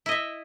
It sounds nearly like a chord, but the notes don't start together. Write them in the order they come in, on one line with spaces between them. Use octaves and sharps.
E4 D#5 E5